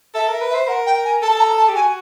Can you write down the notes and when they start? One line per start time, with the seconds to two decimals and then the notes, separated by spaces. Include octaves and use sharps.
0.14 A4 E5
0.28 A#4 E5
0.41 B4
0.50 E5
0.55 C5
0.68 A#4 F#5
0.86 G5
1.04 G#5
1.22 A4 A5
1.35 A5
1.40 A#5
1.58 A5
1.69 G4
1.75 F#4 G#5